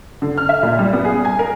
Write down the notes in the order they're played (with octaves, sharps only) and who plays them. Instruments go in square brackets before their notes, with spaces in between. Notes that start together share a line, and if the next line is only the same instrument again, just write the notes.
[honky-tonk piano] D3
F6
E5
A#2
G3
B3
G#4
G#5
A#4